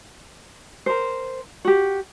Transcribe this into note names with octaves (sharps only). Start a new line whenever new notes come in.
A#4 C5
F#4 G4